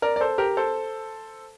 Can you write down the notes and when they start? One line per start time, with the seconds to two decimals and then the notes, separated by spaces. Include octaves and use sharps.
0.02 A#4 D5
0.16 D5
0.21 A4 C5
0.38 G4 A#4
0.57 A4 C5